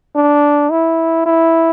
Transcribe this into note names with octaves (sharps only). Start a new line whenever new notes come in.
D4
E4
E4